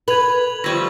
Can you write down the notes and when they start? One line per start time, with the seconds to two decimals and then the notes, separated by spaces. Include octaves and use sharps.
0.08 B4 G#6 F7 F#7
0.64 F3 G3 A3 C#6 G#6 A#6